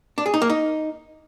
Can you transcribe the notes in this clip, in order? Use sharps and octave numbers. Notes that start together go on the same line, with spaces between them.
D4
G#4
D#4
A#3
D#4